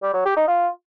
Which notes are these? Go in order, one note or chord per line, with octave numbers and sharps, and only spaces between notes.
G3
F#3
G4
D#4
F4